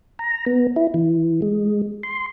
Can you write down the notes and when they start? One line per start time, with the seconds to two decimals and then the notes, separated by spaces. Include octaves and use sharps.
0.19 A#5
0.46 B3
0.76 E4
0.94 E3
1.42 G#3
2.03 C6